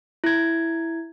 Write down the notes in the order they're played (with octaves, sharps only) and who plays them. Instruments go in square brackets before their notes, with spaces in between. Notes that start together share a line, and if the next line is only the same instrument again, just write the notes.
[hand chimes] E4 G#6